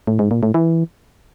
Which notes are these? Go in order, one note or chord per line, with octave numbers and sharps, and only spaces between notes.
A2
G#2
A#2
A2
E3